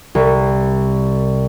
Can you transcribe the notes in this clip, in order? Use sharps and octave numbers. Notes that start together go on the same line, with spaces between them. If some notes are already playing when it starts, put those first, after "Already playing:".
C2